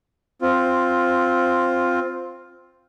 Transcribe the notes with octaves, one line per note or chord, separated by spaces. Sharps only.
C4 F4